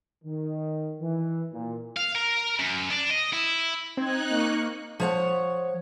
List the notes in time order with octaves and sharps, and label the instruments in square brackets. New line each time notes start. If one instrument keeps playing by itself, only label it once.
[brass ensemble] D#3
E3
A#2
[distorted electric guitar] F5
A#4
F#2
D4
D#5
E4
[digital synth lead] C4 [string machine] D#4 F#6 [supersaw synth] G#6
[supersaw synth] A#3 C#6
[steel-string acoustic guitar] F3 C#5 F#5